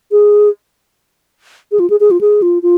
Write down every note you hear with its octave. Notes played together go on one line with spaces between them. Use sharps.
G#4
G#4
F4
G#4
G#4
F4
G#4
F4
F4